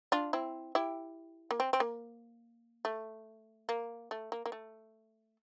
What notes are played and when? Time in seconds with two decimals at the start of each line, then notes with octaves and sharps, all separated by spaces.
0.12 D4 F4
0.33 C4 E4
0.75 E4 G4
1.51 A#3
1.60 C4
1.73 C4
1.80 A#3
2.85 A3
3.69 A#3
4.11 A3
4.32 A#3
4.46 A#3
4.52 A3